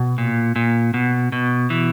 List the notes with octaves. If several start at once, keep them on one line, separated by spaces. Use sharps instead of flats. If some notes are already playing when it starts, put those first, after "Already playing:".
Already playing: B2
A#2
A#2
B2
B2
E3